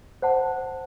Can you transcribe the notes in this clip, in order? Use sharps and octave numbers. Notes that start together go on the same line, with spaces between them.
C5 F#5 A5